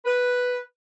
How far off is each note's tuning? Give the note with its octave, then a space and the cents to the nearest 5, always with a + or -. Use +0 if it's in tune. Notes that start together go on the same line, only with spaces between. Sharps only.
B4 +0